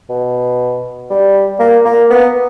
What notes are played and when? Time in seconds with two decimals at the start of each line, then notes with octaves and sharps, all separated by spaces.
0.09 B2
1.10 G3
1.60 A#3
1.85 A#3
2.10 B3